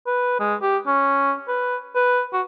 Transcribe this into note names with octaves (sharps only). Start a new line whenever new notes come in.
B4
G#3
G4
C#4
B4
B4
F#4